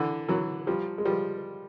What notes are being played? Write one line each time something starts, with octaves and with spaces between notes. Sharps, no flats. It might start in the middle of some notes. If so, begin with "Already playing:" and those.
Already playing: D3 E3
E3 F#3
F3 G3
G#3
F3 G3